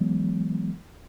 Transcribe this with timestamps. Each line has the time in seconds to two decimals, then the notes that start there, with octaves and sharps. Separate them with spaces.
0.01 E3 F#3 G#3 B3